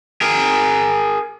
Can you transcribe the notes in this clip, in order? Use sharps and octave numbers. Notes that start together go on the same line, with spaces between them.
G#4 A#4